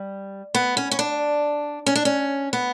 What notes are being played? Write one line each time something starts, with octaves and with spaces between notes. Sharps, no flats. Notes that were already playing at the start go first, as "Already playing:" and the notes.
Already playing: G3
B3
C#4
C#4
D4
C#4
D4
C#4
B3